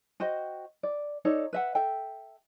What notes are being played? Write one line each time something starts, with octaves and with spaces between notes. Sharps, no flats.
F#4 C5 D#5 G5
D5
D#4 A4 C#5 D5
B4 E5 F#5
A4 E5 G5